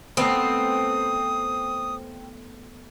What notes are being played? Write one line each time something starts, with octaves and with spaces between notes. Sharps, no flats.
A3 B3 C4 D#6